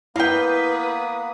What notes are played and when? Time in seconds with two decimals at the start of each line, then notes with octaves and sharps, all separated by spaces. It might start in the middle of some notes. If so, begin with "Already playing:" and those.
0.16 A#3 B3 E4 B4 F5 G5 D#6